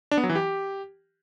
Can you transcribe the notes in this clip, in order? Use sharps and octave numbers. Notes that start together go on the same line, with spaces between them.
D4
B3
F#3
E3
G4